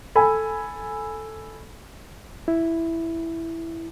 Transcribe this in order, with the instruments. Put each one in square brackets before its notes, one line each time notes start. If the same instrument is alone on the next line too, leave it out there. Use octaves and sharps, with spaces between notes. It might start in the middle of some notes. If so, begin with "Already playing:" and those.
[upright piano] A4 G#5 B5
[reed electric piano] E4